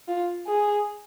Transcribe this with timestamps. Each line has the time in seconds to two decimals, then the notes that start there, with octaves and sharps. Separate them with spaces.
0.08 F4
0.47 G#4